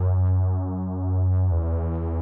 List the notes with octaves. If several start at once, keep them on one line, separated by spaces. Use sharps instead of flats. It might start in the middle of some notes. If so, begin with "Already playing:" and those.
Already playing: F#2
E2